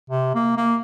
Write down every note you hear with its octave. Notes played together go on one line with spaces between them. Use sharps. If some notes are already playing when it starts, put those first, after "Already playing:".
C3
A#3
A#3